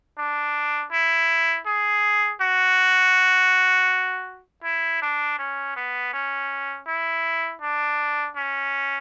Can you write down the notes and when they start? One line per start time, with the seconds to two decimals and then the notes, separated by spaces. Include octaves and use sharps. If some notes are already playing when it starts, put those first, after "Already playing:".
0.18 D4
0.92 E4
1.66 G#4
2.41 F#4
4.64 E4
5.02 D4
5.39 C#4
5.76 B3
6.13 C#4
6.87 E4
7.62 D4
8.36 C#4